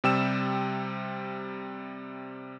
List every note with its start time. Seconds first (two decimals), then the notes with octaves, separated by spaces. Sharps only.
0.04 C3 G3 G5 E6 E7